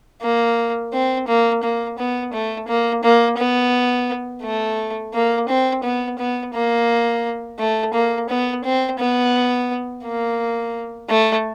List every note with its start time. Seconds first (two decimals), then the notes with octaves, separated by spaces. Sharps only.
0.22 A#3
0.93 C4
1.28 A#3
1.63 A#3
1.98 B3
2.33 A3
2.68 A#3
3.03 A#3
3.38 B3
4.43 A3
5.14 A#3
5.48 C4
5.83 B3
6.18 B3
6.54 A#3
7.59 A3
7.93 A#3
8.29 B3
8.64 C4
8.99 B3
10.04 A#3
11.09 A3